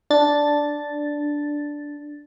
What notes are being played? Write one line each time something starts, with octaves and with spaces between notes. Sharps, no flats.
D4 A6